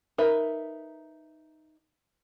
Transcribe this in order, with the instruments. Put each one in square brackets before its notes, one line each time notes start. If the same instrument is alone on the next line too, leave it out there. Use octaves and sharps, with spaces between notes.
[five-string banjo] D#4 A#4 B4 E5